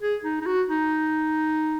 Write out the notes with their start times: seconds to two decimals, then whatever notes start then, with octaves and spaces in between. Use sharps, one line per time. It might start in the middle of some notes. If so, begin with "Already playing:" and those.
0.01 G#4
0.24 D#4
0.41 D#4
0.46 F#4
0.69 D#4